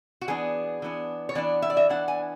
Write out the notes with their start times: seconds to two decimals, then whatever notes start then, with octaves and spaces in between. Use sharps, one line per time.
0.21 F#4
0.28 E3 B3 D4 G#4
0.82 E3 B3 D4
1.29 C#5
1.35 E3 B3 D4 D5
1.62 E5
1.70 D5
1.77 E5
1.89 E3 B3 D4 F#5
2.08 G#5